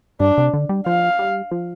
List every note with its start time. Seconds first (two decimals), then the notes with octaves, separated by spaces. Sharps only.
0.20 G2 D4
0.38 C3
0.54 D3
0.69 G3
0.86 F3 F5
1.19 G3
1.51 F3